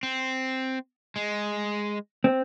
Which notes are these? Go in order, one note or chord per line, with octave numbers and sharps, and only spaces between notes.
C4
G#3
C4